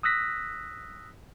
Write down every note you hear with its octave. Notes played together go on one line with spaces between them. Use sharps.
D#6 E6 F#6 A#6 B6